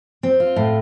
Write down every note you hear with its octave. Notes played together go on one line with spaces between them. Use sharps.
C4
F4
A2